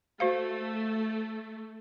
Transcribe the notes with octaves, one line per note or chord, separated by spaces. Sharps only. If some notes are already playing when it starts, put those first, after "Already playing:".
A3 F#4 C5 F5